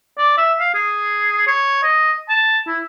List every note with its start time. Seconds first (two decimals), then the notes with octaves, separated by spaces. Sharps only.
0.18 D5
0.38 E5
0.60 F5
0.74 G#4
1.47 C#5
1.83 D#5
2.29 A5
2.67 E4